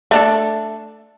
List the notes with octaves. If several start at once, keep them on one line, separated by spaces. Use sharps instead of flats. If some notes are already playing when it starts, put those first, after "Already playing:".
A3 D4 A4